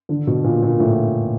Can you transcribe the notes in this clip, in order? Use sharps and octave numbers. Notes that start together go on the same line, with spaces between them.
D3
B2
A#2
A#2
A2